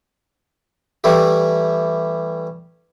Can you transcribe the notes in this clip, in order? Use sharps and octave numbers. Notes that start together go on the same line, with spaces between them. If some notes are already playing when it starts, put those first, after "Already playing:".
E3 G3 A3 E4 G4